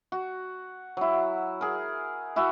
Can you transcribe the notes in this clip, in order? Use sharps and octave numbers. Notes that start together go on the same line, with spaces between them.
F#4
F#3 E4
G#4 A#4
E4 F#4 E5 G#5